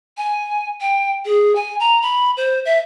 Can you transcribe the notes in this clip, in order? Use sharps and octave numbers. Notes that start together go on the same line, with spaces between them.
G#5
G5
G#4
G#5
A#5
B5
C5
E5